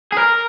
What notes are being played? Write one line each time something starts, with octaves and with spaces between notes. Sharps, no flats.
G#4
A#4